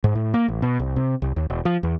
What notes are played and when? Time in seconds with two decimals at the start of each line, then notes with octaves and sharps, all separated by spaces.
0.04 G#2
0.15 A2
0.34 A#3
0.48 A1
0.62 B2
0.79 C2
0.96 C3
1.22 C2
1.36 D#2
1.50 E1
1.65 F3
1.83 E2